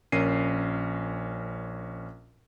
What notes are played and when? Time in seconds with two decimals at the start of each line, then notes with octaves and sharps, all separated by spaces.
0.12 A#1 C#4 A#4 C7 D#7